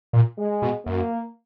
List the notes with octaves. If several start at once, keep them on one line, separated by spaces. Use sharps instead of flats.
A#2
G#3
B2
F#2 A#3